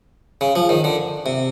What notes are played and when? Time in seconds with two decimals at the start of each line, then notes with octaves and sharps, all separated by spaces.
0.41 C#3
0.56 F3
0.69 D#3
0.84 D3
1.26 C3